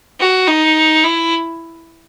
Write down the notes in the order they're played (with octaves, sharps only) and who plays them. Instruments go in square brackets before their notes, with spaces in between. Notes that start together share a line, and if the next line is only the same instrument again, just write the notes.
[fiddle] F#4
D#4
E4